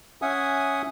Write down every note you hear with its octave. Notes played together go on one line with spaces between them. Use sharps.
C#4 E5 F#5 G#5 D#6